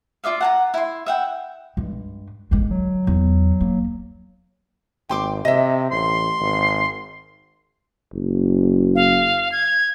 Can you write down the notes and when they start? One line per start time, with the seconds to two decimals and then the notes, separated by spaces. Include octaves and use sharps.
0.24 F4 D5 E5 F5
0.41 F#5 A5 A#5
0.74 E4 C6
1.06 E5 F#5 G5
1.77 G2 G#3
2.51 A1 D3 G#3
2.71 F#3
3.07 E2
3.60 A#3
5.09 G#1 G5 C6 D6
5.45 C3 D#5 E5
5.92 A1 C6
6.40 G#1
8.13 F#1
8.95 F5
9.52 G#6